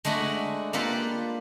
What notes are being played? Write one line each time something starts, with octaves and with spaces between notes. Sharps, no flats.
G#3 A3 D4 E4 F#4
A#3 D4 F4 G4 A4 B4